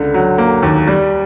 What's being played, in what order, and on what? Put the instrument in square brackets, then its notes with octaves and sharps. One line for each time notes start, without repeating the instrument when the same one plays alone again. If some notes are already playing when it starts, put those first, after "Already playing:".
Already playing: [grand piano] C#2 D3
F#3
A#3
D#2
G3